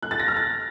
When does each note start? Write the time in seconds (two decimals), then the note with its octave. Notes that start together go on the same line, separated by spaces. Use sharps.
0.02 F#6
0.11 A6
0.19 A#6
0.28 F6
0.36 A6